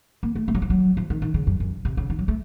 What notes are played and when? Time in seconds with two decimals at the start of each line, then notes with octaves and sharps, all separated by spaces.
0.23 A#3
0.35 A3
0.48 A3
0.55 F#3
0.62 F3
0.70 F#3
0.97 F3
1.10 D#3
1.22 D#3
1.34 C#3
1.47 F#2
1.60 F#2
1.85 C3
1.97 C#3
2.10 D#3
2.19 F#3
2.28 A3